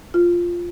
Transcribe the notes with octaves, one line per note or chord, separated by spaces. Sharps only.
F4